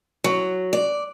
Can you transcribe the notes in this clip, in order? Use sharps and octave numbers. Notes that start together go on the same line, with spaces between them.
F#3
D5